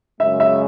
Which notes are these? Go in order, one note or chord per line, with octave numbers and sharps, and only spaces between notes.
F#2 C#3 G#3 E5
E5